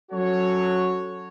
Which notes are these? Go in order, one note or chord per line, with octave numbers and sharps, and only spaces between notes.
F#3 C#4 F#4 A4 C#5